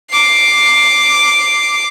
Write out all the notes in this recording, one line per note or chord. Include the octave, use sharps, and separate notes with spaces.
D6 C7